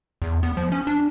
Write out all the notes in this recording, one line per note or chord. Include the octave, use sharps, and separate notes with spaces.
E2
B3
F3
C#4
D4